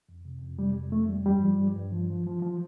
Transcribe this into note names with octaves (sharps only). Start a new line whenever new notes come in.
F2
C3
F2
C3 G3
F2
F2 A3
G3
G2 G3
F3
G2
G2
F3
F3
F3
F3